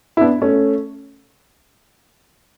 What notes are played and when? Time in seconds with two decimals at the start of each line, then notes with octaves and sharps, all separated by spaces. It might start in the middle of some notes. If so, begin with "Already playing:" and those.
0.17 E4
0.21 B3 D4
0.42 A3 C#4